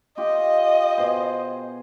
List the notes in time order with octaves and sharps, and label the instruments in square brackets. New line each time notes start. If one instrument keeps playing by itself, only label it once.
[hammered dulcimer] F4 G4 [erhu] D#5
[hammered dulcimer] B2 G#4 C5